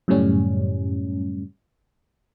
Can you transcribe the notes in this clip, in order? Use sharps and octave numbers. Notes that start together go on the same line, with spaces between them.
F#2 A2 C#3 G3 C#4